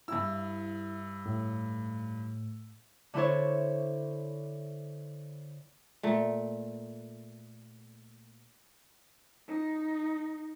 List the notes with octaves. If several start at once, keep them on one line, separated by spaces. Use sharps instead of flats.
G2 E4 E6
A2
D3 D4 E4 A4 C5 C#5
A#2 A3
D#4